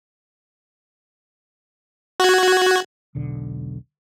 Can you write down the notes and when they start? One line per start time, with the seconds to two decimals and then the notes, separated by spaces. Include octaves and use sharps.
2.20 F#4 F#6 G#6
3.15 E1 B1 D3